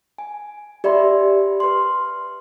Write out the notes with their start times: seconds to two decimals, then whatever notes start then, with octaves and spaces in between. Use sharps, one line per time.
0.18 G#5
0.84 G4 D5 E5 B5 C6
1.60 B4 C6